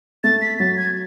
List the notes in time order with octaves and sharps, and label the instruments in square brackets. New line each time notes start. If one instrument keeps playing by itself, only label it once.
[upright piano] A3 [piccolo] A6
[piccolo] B6
[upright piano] F#3 [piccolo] A6
[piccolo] G#6